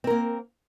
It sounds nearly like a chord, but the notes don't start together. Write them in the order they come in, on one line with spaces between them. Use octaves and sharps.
C4 A#4 A#3